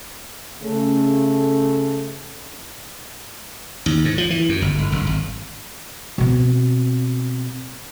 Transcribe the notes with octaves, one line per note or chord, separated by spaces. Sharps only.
C#3 A3
D#2
G#2
F3
E3
F#2
G1
G1
F#1
G#1
B2 C4